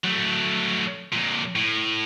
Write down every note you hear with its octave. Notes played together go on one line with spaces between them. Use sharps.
F#3 A3
F2 A#2
A2